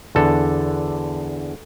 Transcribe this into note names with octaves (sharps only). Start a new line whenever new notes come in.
E2 D3 A4